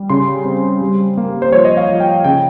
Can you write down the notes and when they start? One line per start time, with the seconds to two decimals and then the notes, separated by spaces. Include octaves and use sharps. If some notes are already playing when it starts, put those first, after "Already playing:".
Already playing: G3
0.10 C#3 C6
0.45 C4
0.81 G3
1.18 A#3
1.42 C5
1.52 F3 C#5
1.65 D#5
1.77 F5
1.89 F3
2.00 G5
2.24 C#3 G5